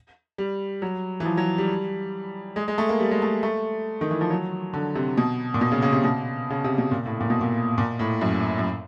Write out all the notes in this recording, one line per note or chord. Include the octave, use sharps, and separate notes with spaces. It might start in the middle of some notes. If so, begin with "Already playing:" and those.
G3
F#3
E3
F3
F#3
G3
G#3
G#3
A3
A#3
G3
G#3
A3
A3
D#3
E3
F3
F#3
D3
C3
B2
A#2
B2
C#3
C#3
C3
B2
C#3
C3
B2
A#2
A2
A#2
B2
A#2
A#2
A2
F#2
F#2